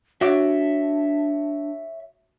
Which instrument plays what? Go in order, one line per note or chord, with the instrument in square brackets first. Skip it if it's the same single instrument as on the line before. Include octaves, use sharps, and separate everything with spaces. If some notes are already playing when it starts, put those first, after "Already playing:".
[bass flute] D4 [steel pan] F#4 D6 [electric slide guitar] C#5 E5